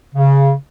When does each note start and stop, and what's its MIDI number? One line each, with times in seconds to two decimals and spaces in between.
0.15 0.52 49